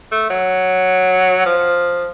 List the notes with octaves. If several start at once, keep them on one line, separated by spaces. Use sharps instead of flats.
A3
F#3
F3